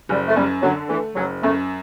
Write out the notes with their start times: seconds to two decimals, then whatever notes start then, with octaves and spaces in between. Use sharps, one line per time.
0.09 F#1 G3
0.27 A3
0.36 F#2 G3
0.62 D3 F#3
0.89 E3 A3
1.16 F#1 F#3
1.42 F#2 A3